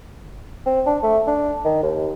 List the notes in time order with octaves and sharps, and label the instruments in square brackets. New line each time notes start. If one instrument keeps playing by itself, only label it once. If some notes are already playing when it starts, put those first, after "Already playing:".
[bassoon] C4
D4
A3
D4
D#3
D#2